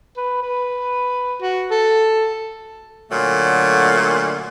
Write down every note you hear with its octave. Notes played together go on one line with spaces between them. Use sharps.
B4
B4
F#4
A4
A#2 D3 F#3 A3